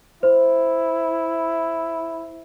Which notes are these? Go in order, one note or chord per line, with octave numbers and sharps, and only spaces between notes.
E4 C5